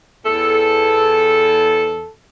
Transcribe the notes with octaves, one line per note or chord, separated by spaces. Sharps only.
E2 A4